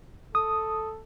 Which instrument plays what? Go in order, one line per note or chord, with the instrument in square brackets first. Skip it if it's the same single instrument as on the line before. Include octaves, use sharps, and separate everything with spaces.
[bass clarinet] A4 [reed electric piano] D#6